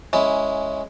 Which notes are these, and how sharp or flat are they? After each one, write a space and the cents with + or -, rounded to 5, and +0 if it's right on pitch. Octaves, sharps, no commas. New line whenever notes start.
G#3 +10 C#4 +0 E4 +0